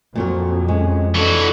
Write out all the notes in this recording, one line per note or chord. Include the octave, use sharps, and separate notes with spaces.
F2 A#2 F#3 A#4
G#3 C#4
E3 D4 F#4 A4 D#5